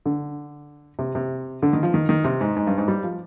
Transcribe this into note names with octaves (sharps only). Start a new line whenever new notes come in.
D3
C3
C3
D3
D#3
F3
D#3
D#3
C3
G#2
G#2
G2
G#2
G3
F3